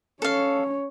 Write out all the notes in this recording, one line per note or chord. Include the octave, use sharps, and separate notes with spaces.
C#4 A4 C#5 F5